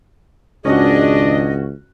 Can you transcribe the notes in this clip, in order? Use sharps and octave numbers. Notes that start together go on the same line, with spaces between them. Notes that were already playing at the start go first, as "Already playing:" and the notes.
G#1 C#2 C#4 D4 F#4 G#4 D#5